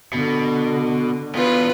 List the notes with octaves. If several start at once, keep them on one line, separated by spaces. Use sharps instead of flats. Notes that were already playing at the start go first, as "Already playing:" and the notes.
B2 D3
E2 B2 F4 B4